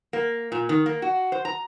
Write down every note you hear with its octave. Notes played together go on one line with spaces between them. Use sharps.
A#3
A#2
D#3
A#3
F#4
C5
A#5